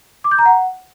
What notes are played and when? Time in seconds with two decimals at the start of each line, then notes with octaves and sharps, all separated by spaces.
0.24 D6
0.31 G6
0.38 A#5
0.46 F#5